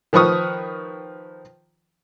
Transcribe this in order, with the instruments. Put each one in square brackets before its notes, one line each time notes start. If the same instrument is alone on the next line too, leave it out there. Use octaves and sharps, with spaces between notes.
[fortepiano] D#3 F3 B4 C#6 D#6 F6